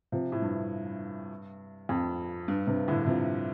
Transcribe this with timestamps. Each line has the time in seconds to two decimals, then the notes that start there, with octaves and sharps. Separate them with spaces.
0.12 C3 F3
0.32 A2
0.42 G2
1.89 F2
2.48 G2
2.67 G2 C3
2.88 A2 D3
3.07 C3 F3